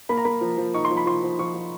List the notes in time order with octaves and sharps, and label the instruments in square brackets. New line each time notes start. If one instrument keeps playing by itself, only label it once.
[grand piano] A#3 B5
A#5
A#3 B5
F3
F3
D#4 C#6
C6
F3
B5
F3 C6
F3
F3 C#6
F3